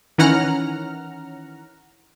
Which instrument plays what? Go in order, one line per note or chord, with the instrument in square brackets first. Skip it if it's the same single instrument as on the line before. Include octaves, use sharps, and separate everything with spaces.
[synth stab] D#3 E3 C#4 F#5 A#5 F6